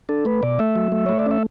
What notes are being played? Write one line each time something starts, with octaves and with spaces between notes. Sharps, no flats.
D4 A4
A3 B4
B2 D5
A3 E5
F#3
A3
A3 C#5
D5
C#4 E5